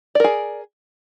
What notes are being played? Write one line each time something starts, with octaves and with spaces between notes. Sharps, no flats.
G#4 A#4 D5